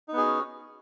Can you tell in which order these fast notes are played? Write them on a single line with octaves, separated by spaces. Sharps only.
D#4 B3 G#4 F#4 C#4